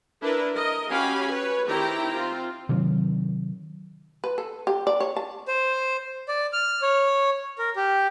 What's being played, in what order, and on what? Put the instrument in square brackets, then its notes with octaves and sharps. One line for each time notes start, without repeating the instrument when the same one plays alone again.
[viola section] D4 E4 A#4 B4
A#4 D#5
C#4 F#4 G4 F5 G#5 B5
B4 C#5
D#3 C4 E4 G4 G5 A#5
C4 F4
[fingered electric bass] C3 D#3 F#3
[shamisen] B4
A4
G4
D5
C#5
A5
[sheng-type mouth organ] C5
D5
F6
C#5
A#4
G4